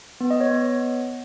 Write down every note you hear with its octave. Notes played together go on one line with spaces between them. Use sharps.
B3
D#5
C#5
B3